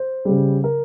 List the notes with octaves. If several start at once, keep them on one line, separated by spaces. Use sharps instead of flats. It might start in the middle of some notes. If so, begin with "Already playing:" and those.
Already playing: C5
C#3 G3
A#4